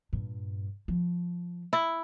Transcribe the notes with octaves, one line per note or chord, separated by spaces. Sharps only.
G2 A#2
F3
E4